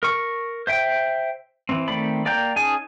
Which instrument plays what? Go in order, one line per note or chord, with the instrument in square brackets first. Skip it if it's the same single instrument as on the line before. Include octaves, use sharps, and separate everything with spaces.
[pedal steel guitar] A#4 C#6
C5 E5 G5
E3 C4
D#3 A3 C4 D5 B5
A#3 D5 G5 A#5 G6
C#4 D#4 G#4 G#5 A5